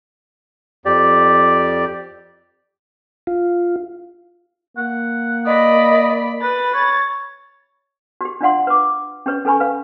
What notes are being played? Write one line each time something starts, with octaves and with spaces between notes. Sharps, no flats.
F2 G4 D5
F4
A#3 F#5
D5 D#5 B5 D#6
B4 B5 A6
C#5
F#4 G4
D4 F4 D5 F5 F#5 C6
B4 D6
C#4 G4 B4 C#5
C#4 A4 B4 G#5 B5 C#6
B4 F5